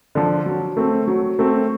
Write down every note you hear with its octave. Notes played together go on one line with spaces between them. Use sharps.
D3 F3
F#3
A3 C4
F#3
A3 C4